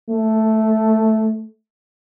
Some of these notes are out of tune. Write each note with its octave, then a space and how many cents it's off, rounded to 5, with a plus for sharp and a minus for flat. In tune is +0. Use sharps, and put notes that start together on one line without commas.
A3 -5